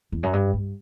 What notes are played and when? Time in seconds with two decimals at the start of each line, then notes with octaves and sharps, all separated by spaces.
0.12 E2
0.23 F#2
0.33 G2
0.53 G2